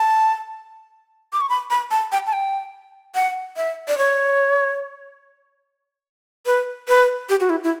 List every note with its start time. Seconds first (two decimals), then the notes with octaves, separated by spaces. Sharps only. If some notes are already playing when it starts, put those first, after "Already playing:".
Already playing: A5
1.33 D6
1.41 C#6
1.49 B5
1.70 B5
1.91 A5
2.12 G5
2.27 A5
2.33 G5
3.15 F#5
3.57 E5
3.88 D5
3.98 C#5
6.46 B4
6.88 B4
7.29 G4
7.40 F#4
7.50 E4
7.64 E4